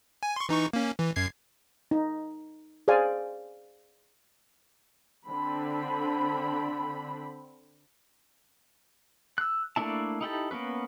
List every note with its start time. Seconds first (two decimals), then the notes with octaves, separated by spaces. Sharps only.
0.23 G#5
0.36 C6 C#6
0.49 E3 D#4 C#6
0.73 A#3 C#4
0.99 E3
1.16 F#2 G#6 C7
1.91 D#4
2.88 G#4 C5 D5 F5 G#5
5.28 D3 C4 B5
9.38 E6 F#6
9.76 A3 A#3 D4 E4 A5
10.21 D#4 E4 G4 A4
10.51 A#3 B3 C#4 B4